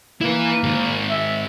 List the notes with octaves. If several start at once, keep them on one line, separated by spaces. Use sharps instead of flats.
A#3 E4 B4
G#2 D#3
E5